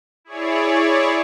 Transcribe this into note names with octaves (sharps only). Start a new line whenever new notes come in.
E4 G#4 C#5 D5